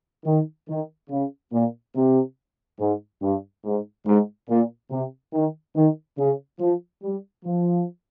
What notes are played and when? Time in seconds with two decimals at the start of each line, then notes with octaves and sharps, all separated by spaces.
0.25 D#3
0.68 D#3
1.10 C#3
1.52 A#2
1.94 C3
2.79 G#2
3.22 G2
3.64 G#2
4.06 G#2
4.49 A#2
4.90 C3
5.33 D#3
5.75 D#3
6.18 C#3
6.60 F3
7.03 G3
7.45 F3